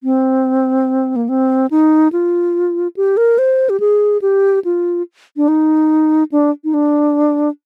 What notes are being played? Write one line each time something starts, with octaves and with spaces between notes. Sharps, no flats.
C4
A#3
C4
D#4
F4
G4
A#4
C5
G4
G#4
G4
F4
D4
D#4
D4
D#4
D4